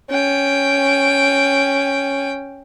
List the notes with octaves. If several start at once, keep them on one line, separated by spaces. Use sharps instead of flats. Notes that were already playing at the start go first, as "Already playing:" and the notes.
C#4 G5